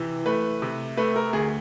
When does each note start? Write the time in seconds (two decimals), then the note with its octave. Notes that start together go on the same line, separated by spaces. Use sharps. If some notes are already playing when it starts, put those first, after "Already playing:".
Already playing: C3 E3
0.26 A3 B4
0.62 C3
0.97 A3 B4
1.16 A#4
1.33 D2 G#4